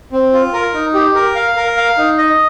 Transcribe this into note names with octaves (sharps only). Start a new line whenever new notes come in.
C4
F4
A#4
D#4
G4
A#4
F5
A#4
F5
D#4
D#5